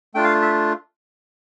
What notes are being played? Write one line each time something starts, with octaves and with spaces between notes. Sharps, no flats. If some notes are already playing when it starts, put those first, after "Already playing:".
A3 D4 F4 G5
F5
E5